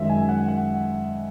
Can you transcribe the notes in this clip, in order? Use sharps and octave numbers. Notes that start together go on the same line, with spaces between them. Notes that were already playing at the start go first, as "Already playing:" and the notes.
Already playing: F#2 D#3 G#3 E5
G#5
F#5
F#5